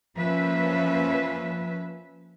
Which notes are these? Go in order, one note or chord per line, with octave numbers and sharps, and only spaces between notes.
F3 A#3 C#4 B4 E5